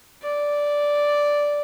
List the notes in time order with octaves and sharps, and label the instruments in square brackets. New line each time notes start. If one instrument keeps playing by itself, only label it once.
[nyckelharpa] D5